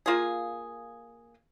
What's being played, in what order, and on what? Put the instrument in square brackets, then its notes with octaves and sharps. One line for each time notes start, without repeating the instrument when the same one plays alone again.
[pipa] A#3 F4 G#4